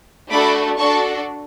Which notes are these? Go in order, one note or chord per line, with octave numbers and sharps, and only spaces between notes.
A3 D4 F#4 A4 B5 D6
D4 F#4 A4 A5 C#6